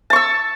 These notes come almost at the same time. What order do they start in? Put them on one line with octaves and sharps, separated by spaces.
A5 C#6 E6